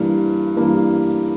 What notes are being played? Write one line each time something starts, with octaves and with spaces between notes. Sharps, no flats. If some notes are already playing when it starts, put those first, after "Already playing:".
Already playing: G2 E3 A#3
G2 E3 A#3